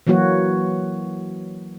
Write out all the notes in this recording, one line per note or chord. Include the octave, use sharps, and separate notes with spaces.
E3 F#3 A#3 F#4 C#5